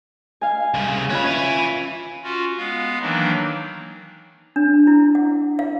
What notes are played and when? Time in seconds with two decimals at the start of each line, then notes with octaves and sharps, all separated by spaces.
0.41 F5 G#5
0.74 C2 C#3
1.10 C#4 F4 B4 C#5 B5
1.26 E5 G#5
2.23 C#4 F4 F#4
2.57 G#3 B3 F5
3.01 D#3 E3 F#3 A#3 D4 D#4
4.56 D4
4.87 E4
5.15 F#5
5.59 F5